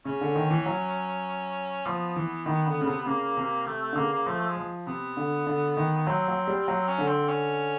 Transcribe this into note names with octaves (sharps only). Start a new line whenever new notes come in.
C#3 C#4
D3
D#3
E3
F#3
F3 B3
E3
D#3
D3
C#3
C3
C#3 A#3
C3
C3 A3
A3
D3
C#3 A#3
A#3
F3 A3
A3
G#3
F3
C3 B3
D3
D3
D#3
B3
F#3 C4
F#3
G3
F#3 C4
C#4
D3
C4
C#4